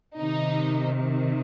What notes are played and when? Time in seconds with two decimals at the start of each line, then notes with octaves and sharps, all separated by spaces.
0.19 C3 D#3 D#4